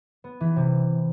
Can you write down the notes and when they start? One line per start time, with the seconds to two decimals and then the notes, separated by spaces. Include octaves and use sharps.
0.24 B3
0.40 E3
0.56 C3